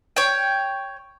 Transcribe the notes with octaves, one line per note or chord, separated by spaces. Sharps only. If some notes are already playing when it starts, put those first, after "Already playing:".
C#5 G5